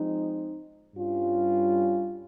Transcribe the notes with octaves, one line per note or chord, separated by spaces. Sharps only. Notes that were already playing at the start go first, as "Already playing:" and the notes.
Already playing: F3 G#3 C4 D#4
G2 G3 C#4 F4